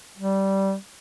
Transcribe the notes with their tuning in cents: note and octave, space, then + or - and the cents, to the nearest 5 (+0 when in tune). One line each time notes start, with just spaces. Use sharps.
G3 -15